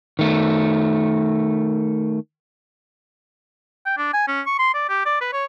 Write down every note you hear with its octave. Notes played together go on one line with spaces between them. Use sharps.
D#3 A3
G5
D4
G#5
C#4
C#6
C6
D5
G4
D5
B4
C#5